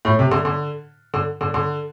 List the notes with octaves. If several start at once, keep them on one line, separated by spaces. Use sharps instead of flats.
A2
C3
D3
D3
D3
D3
D3